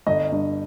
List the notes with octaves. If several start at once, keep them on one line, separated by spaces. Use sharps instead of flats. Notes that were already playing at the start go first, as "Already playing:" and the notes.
G1 D#5
G2